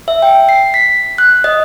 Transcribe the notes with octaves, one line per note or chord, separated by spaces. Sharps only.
E5
G5
C7
B6
F#6
D#5